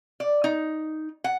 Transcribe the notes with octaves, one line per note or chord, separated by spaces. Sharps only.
D5
D#4
F#5